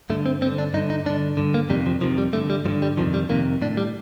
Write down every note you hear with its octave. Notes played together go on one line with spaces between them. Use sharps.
G2 D3 A3
C4
G2 C4
D3
D4
G2 D3 D#4
D#4
G2 D3 D4
G2 D3
A#3
F2 C3 D#3 G3
F3
F2 C3 D#3 F3
G3
G2 D3 A3
G3
G2 D3 F3
G3
F2 C3 D#3 F3
G3
F2 C3 D#3 A#3
A2 D4
G3